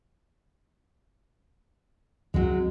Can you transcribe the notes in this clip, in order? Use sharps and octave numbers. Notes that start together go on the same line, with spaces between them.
C#2 F#3 G#3 C4